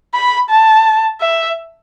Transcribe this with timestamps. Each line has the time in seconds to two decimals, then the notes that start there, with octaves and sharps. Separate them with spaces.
0.14 B5
0.50 A5
1.21 E5